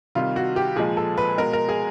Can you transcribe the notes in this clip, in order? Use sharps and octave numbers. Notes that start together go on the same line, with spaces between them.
C3 D#3 G3 F4
F#4
G4
A#2 F3 G#3 G#4
A4
B4
B2 G#3 A#4
A#4
G#4